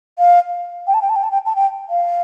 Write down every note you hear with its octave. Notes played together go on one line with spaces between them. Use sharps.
F5
G5
A5
G5
A5
G5
A5
G5
A5
G5
F5